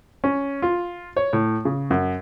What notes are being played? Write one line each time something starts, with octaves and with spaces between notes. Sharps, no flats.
C#4
F4
C#5
A2
C#3
F#2